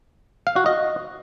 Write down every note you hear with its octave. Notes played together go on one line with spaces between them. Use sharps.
F5
F#4
D#5